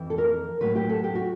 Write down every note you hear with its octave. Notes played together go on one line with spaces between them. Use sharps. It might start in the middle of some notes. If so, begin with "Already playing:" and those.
Already playing: F2 E3
A4
A#4
A2 F#3 B4
G4
A4
G4
F#4